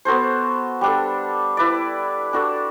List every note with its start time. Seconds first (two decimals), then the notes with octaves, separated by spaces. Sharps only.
0.05 B3 F#4 A4 C5
0.81 G3 D4 A4
1.57 E4 B4 D5
2.33 D4 F#4 A4